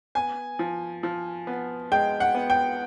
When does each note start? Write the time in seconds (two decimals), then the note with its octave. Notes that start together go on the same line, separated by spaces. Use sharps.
0.15 B3 G#5
0.59 F3
1.03 F3
1.47 B3
1.92 G#3 G5
2.20 F#5
2.35 B3
2.50 G5